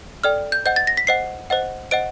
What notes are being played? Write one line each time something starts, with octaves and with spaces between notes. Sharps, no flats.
A4 D5 G5 F6
G6
C5 D#5 F#5 G6
A6
A#6
B6
C5 D#5 F#5 C7
C5 D#5 F#5
C5 D#5 F#5 D7